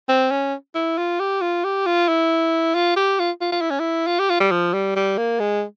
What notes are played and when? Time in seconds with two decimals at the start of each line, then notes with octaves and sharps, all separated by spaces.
0.09 C4
0.31 C#4
0.75 E4
0.98 F4
1.20 G4
1.41 F4
1.64 G4
1.86 F4
2.08 E4
2.75 F4
2.96 G4
3.19 F4
3.41 F4
3.51 F4
3.61 E4
3.70 C#4
3.79 E4
4.07 F4
4.19 G4
4.29 F4
4.40 G3
4.51 F3
4.74 G3
4.96 G3
5.17 A#3
5.39 G#3